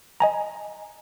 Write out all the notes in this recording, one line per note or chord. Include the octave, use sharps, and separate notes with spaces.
D#5 G#5 A#5